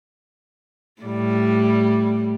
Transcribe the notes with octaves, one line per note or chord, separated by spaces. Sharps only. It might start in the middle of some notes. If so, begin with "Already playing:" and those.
A2 G3